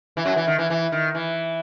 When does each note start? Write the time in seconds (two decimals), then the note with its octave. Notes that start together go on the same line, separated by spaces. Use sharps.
0.17 E3
0.25 F#2 F#3
0.36 E3
0.47 D#3
0.59 E3
0.70 E3
0.92 D#3
1.15 E3